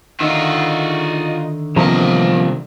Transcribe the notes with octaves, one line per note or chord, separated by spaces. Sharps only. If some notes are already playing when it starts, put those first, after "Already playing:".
D3 D#3 D#4 F4 F#4 E5
C2 C3 E3 F3 A#3 B3 D#5 A#5